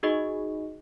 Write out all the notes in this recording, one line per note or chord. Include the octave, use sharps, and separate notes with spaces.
D#4 F#4 G#4 D#5